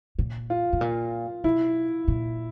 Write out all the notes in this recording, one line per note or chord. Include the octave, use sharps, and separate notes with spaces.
A#2
F4
A2
A#2
B2 E4
A#2